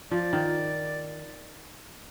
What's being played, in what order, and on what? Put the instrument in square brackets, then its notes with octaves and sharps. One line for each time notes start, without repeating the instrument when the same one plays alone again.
[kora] F3 [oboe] D5
[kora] D#3